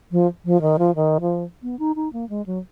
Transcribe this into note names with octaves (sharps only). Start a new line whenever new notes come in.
F3
F3
D#3
F3
D#3
F3
B3
D#4
D#4
A#3
G#3
F#3